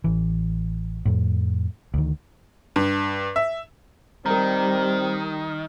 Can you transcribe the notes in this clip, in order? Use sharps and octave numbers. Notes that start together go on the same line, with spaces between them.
A1 E3
F2 A2
D2 D#3
G2
E5
D#3 G3 C4 A#4 A#5